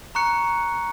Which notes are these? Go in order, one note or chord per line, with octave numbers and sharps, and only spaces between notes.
A#5 C#6 F#6 C#7